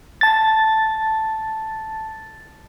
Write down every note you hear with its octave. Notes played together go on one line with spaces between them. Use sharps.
A5 A6